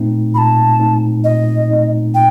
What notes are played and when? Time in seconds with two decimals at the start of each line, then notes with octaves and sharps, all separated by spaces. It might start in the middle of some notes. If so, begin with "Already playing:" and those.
Already playing: A#2 A3 C4 D#4
0.34 A#2 B5
0.38 A5
0.79 A3 C4 D#4
1.24 A#2 D#5
1.69 A3 C4 D#4
2.14 A#2 G5